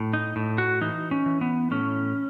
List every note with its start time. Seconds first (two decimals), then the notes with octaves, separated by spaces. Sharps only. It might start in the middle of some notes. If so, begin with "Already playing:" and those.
Already playing: A2
0.13 D#4
0.36 A2
0.58 F#4
0.81 E3 D#4
1.11 C#4
1.26 E3
1.41 B3
1.71 A2 C#4